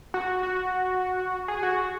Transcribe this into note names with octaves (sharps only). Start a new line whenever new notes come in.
F#4
F#4
G#4
F#4